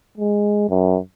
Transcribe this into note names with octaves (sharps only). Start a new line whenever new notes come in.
G#3
F#2